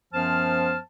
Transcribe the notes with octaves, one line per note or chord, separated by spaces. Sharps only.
F#2 F3 B3 C5 A5 F6